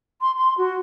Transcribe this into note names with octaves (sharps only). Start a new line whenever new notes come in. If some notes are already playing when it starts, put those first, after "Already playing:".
C6
C6
F#4